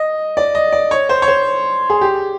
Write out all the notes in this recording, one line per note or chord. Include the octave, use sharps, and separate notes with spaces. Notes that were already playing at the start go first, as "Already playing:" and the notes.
Already playing: D#5
D5
D#5
D5
C#5
C5
C#5
C5
G#4
G4